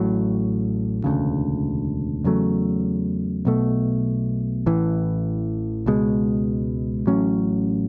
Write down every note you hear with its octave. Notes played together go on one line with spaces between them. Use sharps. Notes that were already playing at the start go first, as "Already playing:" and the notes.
Already playing: A1 A2 F#3
E1 D2 C#3
E2 C#3 F#3 A3
B1 B2 A3
A1 A2 E3
C#2 B2 G#3
A1 A2 F#3 C#4